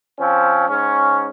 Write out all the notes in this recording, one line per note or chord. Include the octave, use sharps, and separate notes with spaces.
F3 C4 C#4
G#2 C#4